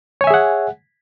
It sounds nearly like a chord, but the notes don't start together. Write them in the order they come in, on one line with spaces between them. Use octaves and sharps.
C#5 G#5 E5 G#4 F#5